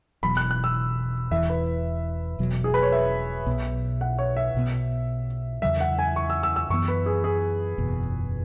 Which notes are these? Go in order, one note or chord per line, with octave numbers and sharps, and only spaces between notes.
E1 E2 B2 F#3 B5
F#6
F#6
E6
E1 E2 E3 E5
B4
E1 E2 B2 F#3
G#4
B4
C#5
E5
B1 B2 B3
F#5
C#5
E5
B1 B2 B3
E2 C#3 F#3 E5
F#5
G#5
C#6
E6
E6
E6
F#2 E3 B3 C#6
B4
G#4
G#4
F#1 E2 B2